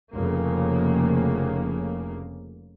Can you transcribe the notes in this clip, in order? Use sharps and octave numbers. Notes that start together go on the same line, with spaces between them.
F1 C#3 A#3